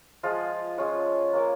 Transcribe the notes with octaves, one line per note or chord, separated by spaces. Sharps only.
F3 G#3 F4 G#4
G#3 C#4 F4 C#5
A#3 C#4 A#4